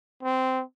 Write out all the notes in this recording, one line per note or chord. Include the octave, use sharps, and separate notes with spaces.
C4